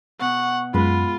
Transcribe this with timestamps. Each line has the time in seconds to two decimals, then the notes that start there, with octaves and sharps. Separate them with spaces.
0.21 B2 F#5 C#6
0.74 F#2 G#3 F4 B4 B5